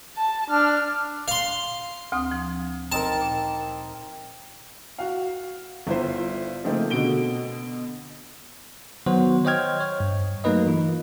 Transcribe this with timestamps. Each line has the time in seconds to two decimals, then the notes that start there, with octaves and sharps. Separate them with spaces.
0.17 A5
0.50 D4 F6
1.28 F5 C6
2.12 D2 C4 D#6
2.31 F3
2.92 C4 D#4 A#4 A5
3.22 A#2
4.98 F#4 F5
5.87 G1 E4 F4 C5
6.64 C#3 F3 A3 A#3 C4 D#4
6.90 B2 D3 F#4 D7 G7
9.06 D#3 F#3 B3 F#4 C5
9.45 C5 C#5 D#5 G5 F6 G#6
9.81 C#5
10.00 G2
10.44 F#3 A3 A#3 D#4 B4 D#5
10.67 E3 F4